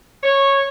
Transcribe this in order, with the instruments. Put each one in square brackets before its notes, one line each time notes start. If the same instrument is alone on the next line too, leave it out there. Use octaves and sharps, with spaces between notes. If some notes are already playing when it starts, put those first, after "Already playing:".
[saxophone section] C#5